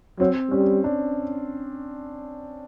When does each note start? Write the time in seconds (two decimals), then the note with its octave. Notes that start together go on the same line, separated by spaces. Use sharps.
0.20 F#3 C4
0.51 G3 C#4
0.84 D4